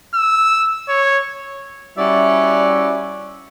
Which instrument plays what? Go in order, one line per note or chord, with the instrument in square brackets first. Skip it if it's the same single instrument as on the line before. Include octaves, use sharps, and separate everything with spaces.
[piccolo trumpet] E6
C#5
[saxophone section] G3 C#4 E4 F#4 D5 E5